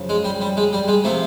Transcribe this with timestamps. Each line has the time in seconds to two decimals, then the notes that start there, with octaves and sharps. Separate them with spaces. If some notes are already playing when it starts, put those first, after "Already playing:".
Already playing: F#2 C#3 F3
0.09 G#3
0.24 G3
0.41 G3
0.57 G#3
0.73 G3
0.88 G#3
1.04 C3 F3 A3